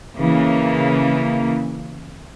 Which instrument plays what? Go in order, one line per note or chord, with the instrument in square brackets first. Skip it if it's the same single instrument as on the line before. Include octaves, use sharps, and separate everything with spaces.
[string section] C#3 E3 A#3